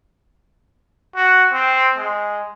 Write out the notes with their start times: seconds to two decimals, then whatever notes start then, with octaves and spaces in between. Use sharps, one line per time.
1.16 F#4
1.53 C4
1.97 G#3